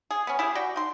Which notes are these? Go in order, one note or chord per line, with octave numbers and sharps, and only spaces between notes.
G#4
B3 C#4
E4 G4 G#4
F#4 D5 G5
D#4 C6